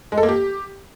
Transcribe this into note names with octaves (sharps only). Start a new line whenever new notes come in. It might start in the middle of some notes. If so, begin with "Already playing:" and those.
G#3
A4
A#3
G4